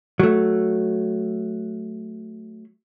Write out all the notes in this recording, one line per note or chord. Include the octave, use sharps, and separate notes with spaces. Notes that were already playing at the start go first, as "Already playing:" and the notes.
F#3 A3